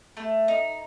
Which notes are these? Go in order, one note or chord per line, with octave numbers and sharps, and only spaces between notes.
A3
D#4